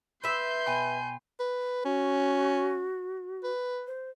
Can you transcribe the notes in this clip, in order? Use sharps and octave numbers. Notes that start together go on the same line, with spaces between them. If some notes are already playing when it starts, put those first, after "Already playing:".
B4 E5 C6 G6
B2 G5 G#5 B5
B4
C#4 F#4
B4
C5